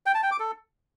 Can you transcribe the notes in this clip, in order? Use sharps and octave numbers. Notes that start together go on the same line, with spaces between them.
G5
A5
G5
D6
A4